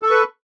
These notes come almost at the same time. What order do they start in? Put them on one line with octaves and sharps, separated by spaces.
A4 C#6 B4